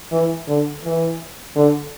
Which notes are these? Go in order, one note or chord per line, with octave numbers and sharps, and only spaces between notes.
E3
D3
E3
D3